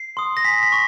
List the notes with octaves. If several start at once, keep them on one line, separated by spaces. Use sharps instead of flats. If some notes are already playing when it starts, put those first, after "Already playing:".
Already playing: C7
C6 D#6
A#6
G#5 B6
B6
C#6